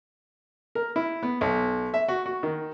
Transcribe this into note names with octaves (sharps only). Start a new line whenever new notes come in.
A#4
E4
B3
B1
E5
F#4
F#4
D#3